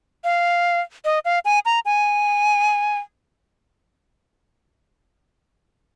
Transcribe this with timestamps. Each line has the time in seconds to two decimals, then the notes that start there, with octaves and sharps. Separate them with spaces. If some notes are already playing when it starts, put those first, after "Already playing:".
0.24 F5
1.05 D#5
1.25 F5
1.45 G#5
1.66 A#5
1.85 G#5